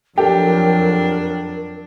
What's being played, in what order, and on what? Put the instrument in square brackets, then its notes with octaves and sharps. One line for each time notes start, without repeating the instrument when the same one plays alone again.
[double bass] F2 F#3 [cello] D4 [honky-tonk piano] G4 A4 [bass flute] A#4